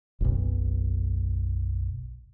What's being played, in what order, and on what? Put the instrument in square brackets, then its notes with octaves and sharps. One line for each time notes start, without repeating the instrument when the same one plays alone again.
[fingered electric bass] F#1 B1